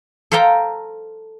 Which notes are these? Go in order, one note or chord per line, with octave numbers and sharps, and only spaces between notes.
A4 C5 F5 G5 A#5